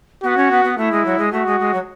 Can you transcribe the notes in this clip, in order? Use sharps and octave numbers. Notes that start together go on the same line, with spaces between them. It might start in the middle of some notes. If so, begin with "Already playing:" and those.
B3 F#4
C#4
B3
B3
A3 E4
G#3
F#3
G#3
A3 F#4
G#3
G#3
F#3